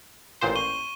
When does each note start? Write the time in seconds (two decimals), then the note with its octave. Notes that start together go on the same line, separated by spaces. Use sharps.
0.41 A1 A#2 C5
0.56 C#6 D#7 G7